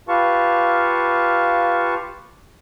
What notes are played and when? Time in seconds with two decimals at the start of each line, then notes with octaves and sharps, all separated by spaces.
0.09 F4 G4 B4 F5 A5 C#6